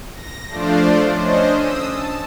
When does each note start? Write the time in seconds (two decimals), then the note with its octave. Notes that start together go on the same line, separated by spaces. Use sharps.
0.12 A#6
0.48 F3 A3 D4 F4 C5 D5
1.12 C#4 D4 C5 D#5
1.52 D#6 E6
1.90 A5